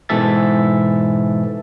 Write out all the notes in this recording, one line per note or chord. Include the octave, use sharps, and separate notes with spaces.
G#2 B2 E3 A4 E5 A6